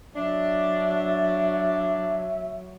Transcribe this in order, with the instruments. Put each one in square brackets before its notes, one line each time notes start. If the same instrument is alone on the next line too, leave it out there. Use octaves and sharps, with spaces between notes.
[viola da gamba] F#3 [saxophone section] D4 [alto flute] E5